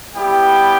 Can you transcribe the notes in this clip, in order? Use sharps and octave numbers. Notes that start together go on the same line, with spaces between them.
G3 B3 E4 G4 G5